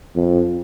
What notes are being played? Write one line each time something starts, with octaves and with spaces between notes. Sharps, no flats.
F2